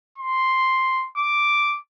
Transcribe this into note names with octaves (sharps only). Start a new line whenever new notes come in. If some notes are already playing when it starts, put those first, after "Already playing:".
C6
D6